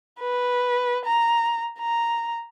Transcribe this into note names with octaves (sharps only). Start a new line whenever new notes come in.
B4
A#5
A#5